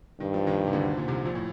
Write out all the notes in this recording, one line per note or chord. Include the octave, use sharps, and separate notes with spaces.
G2 D#3
F3
D#2 D#3
C3
D2 D3
A#2
C2 C3
A#1 A#2
A2